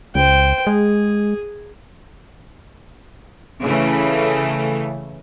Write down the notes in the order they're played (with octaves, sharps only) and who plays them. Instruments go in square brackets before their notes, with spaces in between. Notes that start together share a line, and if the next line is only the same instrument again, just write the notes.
[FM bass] C#2 [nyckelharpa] C5 G5
[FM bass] G#3 [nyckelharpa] G#4
[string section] C#3 E3 A3